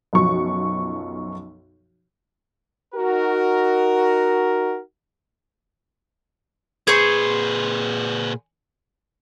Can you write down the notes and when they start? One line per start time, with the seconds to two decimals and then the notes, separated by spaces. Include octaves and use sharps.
0.13 B1 F#2 F3 C#6
2.95 D#4 F#4 A#4
6.87 A#2 G#4 B4 C5 C#6